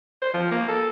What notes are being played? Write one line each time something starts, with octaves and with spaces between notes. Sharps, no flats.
C5
F3
A#3
A4